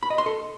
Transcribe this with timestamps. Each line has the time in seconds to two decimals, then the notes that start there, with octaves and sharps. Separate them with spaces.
0.03 B5
0.10 D#5
0.18 C6
0.26 A4